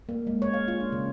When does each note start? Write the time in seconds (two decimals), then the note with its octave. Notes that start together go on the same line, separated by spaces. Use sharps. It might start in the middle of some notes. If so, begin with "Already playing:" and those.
0.09 A#3
0.27 G#3
0.42 C#5
0.54 F5
0.68 F4
0.80 D4
0.92 C#3